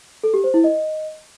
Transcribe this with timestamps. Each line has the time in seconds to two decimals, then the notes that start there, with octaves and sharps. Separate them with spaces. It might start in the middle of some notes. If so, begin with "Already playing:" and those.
0.24 A4
0.34 G4
0.44 C5
0.54 E4
0.64 D#5